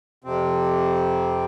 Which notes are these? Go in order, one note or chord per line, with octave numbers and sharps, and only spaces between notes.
F2 C3 C4